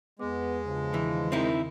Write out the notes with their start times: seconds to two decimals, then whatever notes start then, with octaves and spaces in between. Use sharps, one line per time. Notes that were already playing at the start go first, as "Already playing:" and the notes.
0.19 E2 G#3 B3 D6
0.65 G2 C#3 F3
0.94 D#3 E3
1.32 C4 D#4 E4 A#4